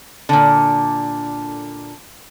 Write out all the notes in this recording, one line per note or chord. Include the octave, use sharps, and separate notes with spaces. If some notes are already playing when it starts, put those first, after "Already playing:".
A#2 D3